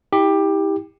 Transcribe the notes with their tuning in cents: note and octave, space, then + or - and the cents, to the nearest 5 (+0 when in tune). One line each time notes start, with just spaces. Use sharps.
E4 -35 G4 +15